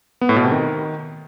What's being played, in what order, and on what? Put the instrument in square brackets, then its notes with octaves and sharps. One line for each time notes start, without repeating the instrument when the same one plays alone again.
[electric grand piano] B3
A2
B2
C3
D#3